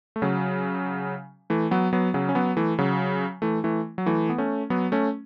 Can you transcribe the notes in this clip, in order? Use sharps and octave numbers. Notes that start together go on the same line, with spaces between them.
A3
C#3 F#3
E3 A3
F#3 B3
F#3 B3
C#3 F#3
C#4
F#3 B3
E3 A3
C#3 F#3
E3 A3
E3 A3
F#3
E3 A3
B3
A3 C#4
F#3 B3
A3 C#4